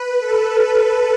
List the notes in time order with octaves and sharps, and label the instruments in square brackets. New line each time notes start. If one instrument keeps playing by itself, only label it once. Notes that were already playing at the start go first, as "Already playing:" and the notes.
Already playing: [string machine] B4
A4